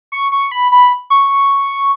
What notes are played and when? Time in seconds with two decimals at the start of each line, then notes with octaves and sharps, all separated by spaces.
0.12 C#6
0.32 C#6
0.52 B5
0.72 B5
1.10 C#6